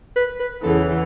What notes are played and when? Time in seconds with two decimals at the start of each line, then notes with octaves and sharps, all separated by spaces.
0.16 B4
0.40 B4
0.62 E2 C#3 E3 B3 A4